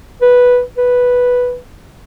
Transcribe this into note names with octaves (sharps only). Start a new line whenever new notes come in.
B4
B4